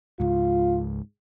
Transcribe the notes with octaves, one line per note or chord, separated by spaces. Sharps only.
C#2 G#2 F4